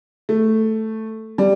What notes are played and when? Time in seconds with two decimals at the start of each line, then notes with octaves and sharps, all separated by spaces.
0.29 A3
1.38 G3